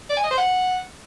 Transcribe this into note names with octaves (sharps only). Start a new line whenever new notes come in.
D5
G#5
D#5
C5
F#5